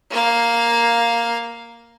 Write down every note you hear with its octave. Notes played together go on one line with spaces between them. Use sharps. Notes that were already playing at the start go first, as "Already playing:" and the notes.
A#3 F5